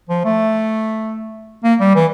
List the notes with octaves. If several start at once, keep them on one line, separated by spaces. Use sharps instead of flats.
F3
A3
A#3
G3
E3